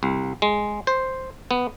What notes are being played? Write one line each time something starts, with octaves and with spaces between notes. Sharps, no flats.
C2
G#3
C5
B3